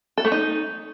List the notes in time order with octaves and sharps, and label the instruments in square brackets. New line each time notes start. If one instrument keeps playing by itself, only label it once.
[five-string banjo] A4
A3
D#4